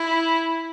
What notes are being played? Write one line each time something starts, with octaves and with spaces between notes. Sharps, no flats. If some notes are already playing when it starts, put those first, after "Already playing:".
Already playing: E4